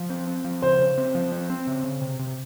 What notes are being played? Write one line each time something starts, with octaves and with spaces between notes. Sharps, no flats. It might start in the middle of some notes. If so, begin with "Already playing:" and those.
Already playing: F3
C4
C4
F3
C#3 C5
C#3
C4
F3
C4
C4
C#3
C#3
C3
C3